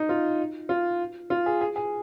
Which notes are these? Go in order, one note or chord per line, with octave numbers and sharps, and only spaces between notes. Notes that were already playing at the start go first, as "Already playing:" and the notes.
Already playing: D#4
F4
F4
F4
G#4
G#4
G#4